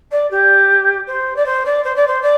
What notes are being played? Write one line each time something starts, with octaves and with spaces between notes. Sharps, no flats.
D5
G4
C5
D5
C5
D5
C5
D5
C5
D5